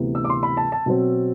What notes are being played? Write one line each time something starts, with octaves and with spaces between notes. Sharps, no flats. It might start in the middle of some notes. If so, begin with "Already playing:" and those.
Already playing: D2 C3 E3 B3
E6
D6
C6
B5
A5
A5
B2 F#3 C4